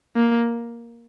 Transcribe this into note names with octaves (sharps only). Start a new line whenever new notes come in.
A#3